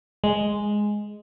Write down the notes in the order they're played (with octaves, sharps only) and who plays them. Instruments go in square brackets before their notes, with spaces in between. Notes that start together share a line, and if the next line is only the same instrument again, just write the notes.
[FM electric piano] G#3